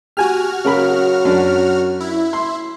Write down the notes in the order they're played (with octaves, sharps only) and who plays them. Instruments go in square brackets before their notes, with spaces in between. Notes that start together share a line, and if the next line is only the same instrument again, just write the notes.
[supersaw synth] F#4 F6 [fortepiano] G4 G#5
[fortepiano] C#3 A#4 B5 [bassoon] F#3
[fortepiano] F#2 D4
[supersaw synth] E4
[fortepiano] C6